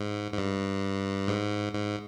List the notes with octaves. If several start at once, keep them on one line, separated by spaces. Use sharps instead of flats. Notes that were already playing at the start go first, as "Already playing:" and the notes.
Already playing: G#2
G#2
G2
G#2
G#2